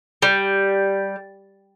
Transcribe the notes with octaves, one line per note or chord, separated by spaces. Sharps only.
G3